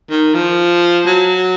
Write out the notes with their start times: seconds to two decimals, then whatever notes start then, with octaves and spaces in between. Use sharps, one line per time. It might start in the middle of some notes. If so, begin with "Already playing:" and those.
0.10 D#3
0.34 F3
1.06 F#3